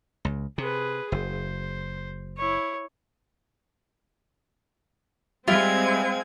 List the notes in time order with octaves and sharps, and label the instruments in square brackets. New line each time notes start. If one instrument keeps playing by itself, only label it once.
[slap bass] C#2
[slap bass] C3 [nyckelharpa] G#4 B4
[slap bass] F#1 [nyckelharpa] C5
[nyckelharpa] E4 C#5
[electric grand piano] G3 E5 [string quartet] G#3 G#6 [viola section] C4 [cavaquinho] F4